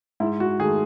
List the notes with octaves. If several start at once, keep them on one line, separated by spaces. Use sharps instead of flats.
G#2 E4
F#4
D#3 A3 G#4